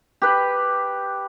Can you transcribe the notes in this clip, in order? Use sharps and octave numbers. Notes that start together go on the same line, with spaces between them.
G4 B4